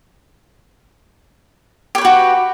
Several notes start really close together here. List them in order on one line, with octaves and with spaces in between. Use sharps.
G4 C#5 B4 F#4